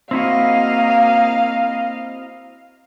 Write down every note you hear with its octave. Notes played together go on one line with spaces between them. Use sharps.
A#3 C4 E4 F#4 D#5 F5